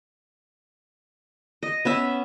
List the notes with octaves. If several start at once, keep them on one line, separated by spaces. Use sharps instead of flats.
D#5
B3 C#4 E5